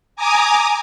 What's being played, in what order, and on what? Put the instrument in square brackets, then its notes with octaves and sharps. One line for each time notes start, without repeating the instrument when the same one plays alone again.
[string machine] G#5 A#5 D6 D#6